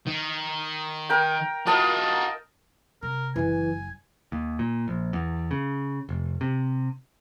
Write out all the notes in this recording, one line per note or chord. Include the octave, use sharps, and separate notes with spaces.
D#3
A#4 G5
F4 F#4 A#4 D#5 A5
C3 A#4
F#1 E3 E4 G#5
D#2
A#2
A#1
E2
C#3
F1
C3